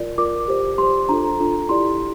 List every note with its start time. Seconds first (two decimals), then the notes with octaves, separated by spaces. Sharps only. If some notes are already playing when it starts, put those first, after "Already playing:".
Already playing: F4 A#4 D5
0.18 F4 A#4 D5 D6
0.48 G4 C5
0.78 G4 C5 C6
1.09 D4 F4 A4 A#5
1.39 D4 F4 A4
1.69 E4 G4 D5 C6